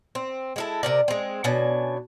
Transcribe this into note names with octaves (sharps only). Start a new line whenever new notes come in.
C4
G#3 E4 A4
C3 A#4 D5
G#3 C4
B2 C#4 D4 G#5